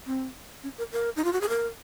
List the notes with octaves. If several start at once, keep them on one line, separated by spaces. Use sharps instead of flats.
C4
C#4
A#4
A#4
D#4
F4
F#4
G#4
A#4